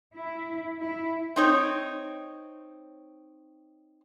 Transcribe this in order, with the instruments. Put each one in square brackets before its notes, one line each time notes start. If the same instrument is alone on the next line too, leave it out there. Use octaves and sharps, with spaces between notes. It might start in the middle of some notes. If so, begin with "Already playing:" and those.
[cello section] E4
E4
[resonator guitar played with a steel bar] C4 D#4 C#5